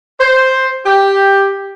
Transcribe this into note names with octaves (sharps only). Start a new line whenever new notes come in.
C5
G4